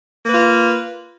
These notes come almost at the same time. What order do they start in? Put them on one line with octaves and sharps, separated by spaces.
A#3 B4 F4